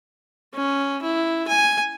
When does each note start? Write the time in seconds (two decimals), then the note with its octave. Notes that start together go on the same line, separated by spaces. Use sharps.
0.54 C#4
1.02 E4
1.48 G#5